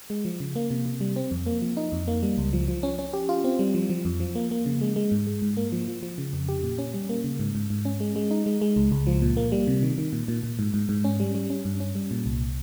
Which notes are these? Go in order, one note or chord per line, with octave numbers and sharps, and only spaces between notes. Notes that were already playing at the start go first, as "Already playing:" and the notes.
G#3
F3
C#3
A#3
C3
C3
G3
C4
F2
A#3
F3
D#4
F2
A#3
G3
C#2
F3
F3
C#4
C#4
G4
F4
C4
G3
F3
F3
F2
F3
A#3
A#3
C#3
G#3
G#3
G#2
G#3
G#2
A#3
F3
F3
F3
C#3
F2
G4
A#2
C#4
G3
A#3
C#3
G#2
G#2
G#2
C#4
G#3
G#3
D#4
G#3
G#3
C#2
C#2
F3
A#2
A#3
G3
C3
D#3
D#3
A#2
A#2
A#2
G#2
G#2
G#2
C#4
G3
G3
C#4
G2
C#4
G3
A#2
C2